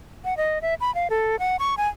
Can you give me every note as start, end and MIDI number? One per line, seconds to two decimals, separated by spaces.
0.25 0.37 78
0.37 0.61 75
0.62 0.74 76
0.81 0.93 83
0.95 1.08 77
1.10 1.39 69
1.39 1.56 78
1.59 1.75 85
1.78 1.88 80